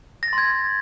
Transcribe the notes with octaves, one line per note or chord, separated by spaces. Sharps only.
A#6
A6
C6
G#6